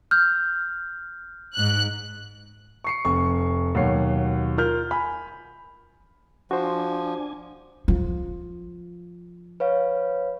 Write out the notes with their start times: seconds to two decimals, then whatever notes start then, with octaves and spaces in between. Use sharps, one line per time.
0.11 F6 G6
1.54 G#2 F#6
2.84 C#6 C7 C#7
3.05 F1 C#6
3.75 D#2 B2 F#3 C#5 C7
4.58 F4 A#4 F6 G6
4.91 G#5 B5
6.51 F3 D4 F#4 C5 G#5
7.88 F3
9.60 B4 C#5 F5